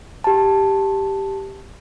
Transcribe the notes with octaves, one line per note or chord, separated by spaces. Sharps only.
G4 A5